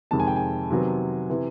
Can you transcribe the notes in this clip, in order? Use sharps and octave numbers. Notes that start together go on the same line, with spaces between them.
F2 C3 D#3 G#3 A5
G#5
G5
G#5
C3 D#3 F#3 B3
C3 E3